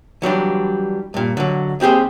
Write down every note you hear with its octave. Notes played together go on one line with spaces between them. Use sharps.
E3 F#3 G3 D4
G2 A#2
D3 F#3
D#2 C4 G4 G#4 C5